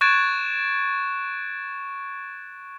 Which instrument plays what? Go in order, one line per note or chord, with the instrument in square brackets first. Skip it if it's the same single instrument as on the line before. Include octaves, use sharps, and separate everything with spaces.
[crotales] C#6 F#6 G#6 A6 D7 E7